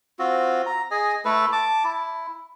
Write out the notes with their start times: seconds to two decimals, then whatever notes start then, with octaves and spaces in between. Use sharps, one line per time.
0.19 C4 F4 F#4
0.66 A#5
0.91 G#4 D#5 G#5
1.25 A3 E4 A4 B4
1.52 A5 D6
1.84 E4